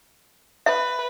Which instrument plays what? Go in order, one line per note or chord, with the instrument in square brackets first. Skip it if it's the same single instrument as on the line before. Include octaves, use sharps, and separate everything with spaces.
[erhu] B4 [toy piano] E5